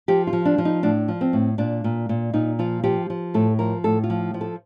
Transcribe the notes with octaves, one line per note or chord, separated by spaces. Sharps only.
F3 G4
F4
F3
D4
F3
D#4
A2 D4
F3
C4
A2
A#2 D4
A#2
A#2
A#2 D#4
F3 F4
F3 G4
F3
A2 A4
F3 A#4
A2 A4
F4
F3
F3
A4